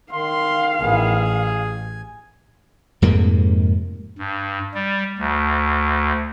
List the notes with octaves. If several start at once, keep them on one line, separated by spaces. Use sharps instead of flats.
D#3 F5 C6
A1 D#3 E3 B3 G#4
G#5
F2 G#2 C3 A#3
G2
G3
D2